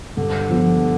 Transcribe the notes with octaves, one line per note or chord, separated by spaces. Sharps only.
G2 D3
F3 B3